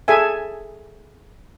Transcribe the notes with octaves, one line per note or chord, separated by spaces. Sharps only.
G#4 A4 E5 G#5